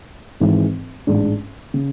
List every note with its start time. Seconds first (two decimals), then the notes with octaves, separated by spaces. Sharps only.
0.40 G#1 G#2 E3 G#3
1.07 A1 G#2 G#3 D4
1.74 C#3